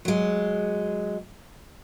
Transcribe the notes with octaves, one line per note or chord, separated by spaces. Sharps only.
F#3 G#3